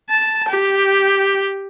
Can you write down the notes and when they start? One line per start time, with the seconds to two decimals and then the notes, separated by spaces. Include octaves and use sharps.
0.11 A5
0.49 G4